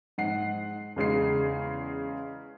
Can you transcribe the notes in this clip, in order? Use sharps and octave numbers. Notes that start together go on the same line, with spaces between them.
G#2 F#5 C7
E2 C#3 G#3 C7